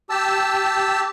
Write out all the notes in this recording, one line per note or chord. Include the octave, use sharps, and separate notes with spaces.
G4 A5 E6